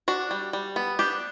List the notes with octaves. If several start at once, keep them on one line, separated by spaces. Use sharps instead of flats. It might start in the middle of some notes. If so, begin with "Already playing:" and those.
D4 F#4
G3
G3
B3
D4 G4